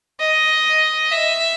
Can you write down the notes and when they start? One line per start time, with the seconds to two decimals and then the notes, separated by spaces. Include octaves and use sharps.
0.21 D#5
1.12 E5